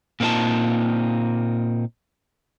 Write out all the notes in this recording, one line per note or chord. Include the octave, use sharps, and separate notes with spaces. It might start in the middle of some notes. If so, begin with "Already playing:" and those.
A#2 A#3 C4 D#4 F4 A5